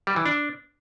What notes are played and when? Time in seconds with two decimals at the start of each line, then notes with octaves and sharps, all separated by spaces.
0.07 G3
0.16 E3
0.26 D4